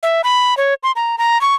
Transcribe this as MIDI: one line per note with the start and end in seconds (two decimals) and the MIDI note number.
0.03 0.22 76
0.24 0.57 83
0.57 0.74 73
0.83 0.92 84
0.96 1.18 82
1.18 1.40 82
1.41 1.55 85